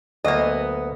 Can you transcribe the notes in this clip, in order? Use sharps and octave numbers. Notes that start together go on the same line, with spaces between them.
D2 F#3 A#3 B3 D#5